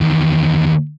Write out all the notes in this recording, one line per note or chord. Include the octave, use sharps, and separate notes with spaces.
E2 D#3